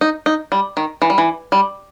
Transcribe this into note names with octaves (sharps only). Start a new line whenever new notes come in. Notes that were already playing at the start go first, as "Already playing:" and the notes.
D#4
D#4
G3
D#3
E3
G3
E3
G3